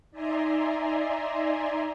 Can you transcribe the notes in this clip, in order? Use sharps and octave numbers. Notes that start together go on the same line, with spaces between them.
D#4 D5 E5 G#5 A#5 C6